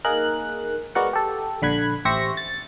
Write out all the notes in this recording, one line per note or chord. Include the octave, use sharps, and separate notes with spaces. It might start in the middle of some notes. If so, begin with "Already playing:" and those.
A#3 D#4 G#4 A#4 F#6
G#3 B3 F#4 A#4 D5 F#5
G4 A4
A#1 D3 B5 F#6 G#6
A1 G4 C5 E5 C#6 A#6
A6